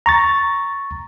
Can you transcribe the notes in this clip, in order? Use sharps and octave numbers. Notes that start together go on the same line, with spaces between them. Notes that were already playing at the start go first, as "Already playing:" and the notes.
A#5 C#6 A6